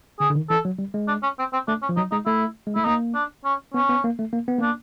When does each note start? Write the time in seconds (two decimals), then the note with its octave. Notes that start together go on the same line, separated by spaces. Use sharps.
0.20 D3 G#4
0.30 D3
0.35 D#3
0.50 E3 A4
0.65 F#3
0.79 G3
0.94 G#3
1.08 D4
1.23 C#4
1.39 C4
1.53 C4
1.68 A3 D4
1.82 C#4
1.89 F3
1.97 F#3 D#4
2.11 G#3 D#4
2.26 A3 E4
2.67 G#3
2.76 A3 E4
2.85 A#3 D#4
3.15 D4
3.45 C#4
3.74 B3 C#4
3.89 B3
4.04 A#3
4.19 A3
4.33 A#3
4.48 B3
4.59 A#3 D4